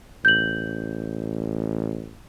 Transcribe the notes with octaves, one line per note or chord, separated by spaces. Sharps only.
A1 G6 F#7